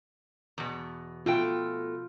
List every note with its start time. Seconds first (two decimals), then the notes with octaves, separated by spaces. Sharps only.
0.58 E2 B2
1.26 B2 A3 F4 G5